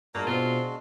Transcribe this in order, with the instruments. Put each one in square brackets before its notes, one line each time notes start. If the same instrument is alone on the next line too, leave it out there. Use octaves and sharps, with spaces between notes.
[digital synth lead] G2 [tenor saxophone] A#2 [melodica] G#3 D4 F#4 [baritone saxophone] A#3
[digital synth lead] B2 [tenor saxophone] C4 [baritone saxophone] F4